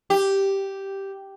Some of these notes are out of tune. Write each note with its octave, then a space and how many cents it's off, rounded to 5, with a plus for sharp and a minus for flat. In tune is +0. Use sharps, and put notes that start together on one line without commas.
G4 -5